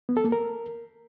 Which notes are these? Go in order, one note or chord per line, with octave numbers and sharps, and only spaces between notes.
B3
A4
A#3
A#4